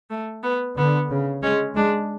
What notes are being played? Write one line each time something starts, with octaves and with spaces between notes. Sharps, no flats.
A3
B3
D3 B3
C#3
G#3 C#4
G#3 D4